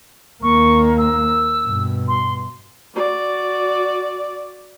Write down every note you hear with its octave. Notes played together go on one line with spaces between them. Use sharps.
D#2 A#3 C#6
E6
G2 B2
C6
F#4 D5